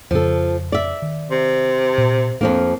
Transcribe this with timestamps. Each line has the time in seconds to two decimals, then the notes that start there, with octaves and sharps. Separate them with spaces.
0.11 F2 C#3 F3 A4
0.72 D5 E5
1.02 D#3
1.30 C3
1.98 A#2
2.41 F2 F3 A#3 D4